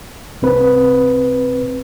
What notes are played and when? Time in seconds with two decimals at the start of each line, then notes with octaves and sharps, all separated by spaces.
0.42 C2 C4 B4